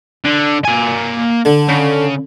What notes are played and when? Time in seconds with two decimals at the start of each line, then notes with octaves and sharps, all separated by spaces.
0.24 D3
0.65 A#3 G#5
1.45 D3
1.68 C#3